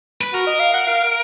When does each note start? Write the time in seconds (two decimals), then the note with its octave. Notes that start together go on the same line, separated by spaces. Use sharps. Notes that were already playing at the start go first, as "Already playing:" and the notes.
0.21 B4
0.33 F#4 A#4
0.47 D#5
0.60 F5
0.74 F#5
0.87 F5